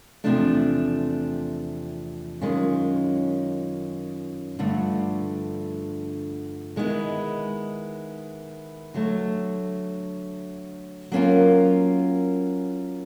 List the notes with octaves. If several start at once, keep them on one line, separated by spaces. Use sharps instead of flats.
E2 C3 F3 A3 D4
F#2 D#3 G#3 C#4 F4
G2 D3 F3 A3
D#3 G#3 B3 E4
D3 F#3 A3
F#3 A#3 C#4 F4 A#4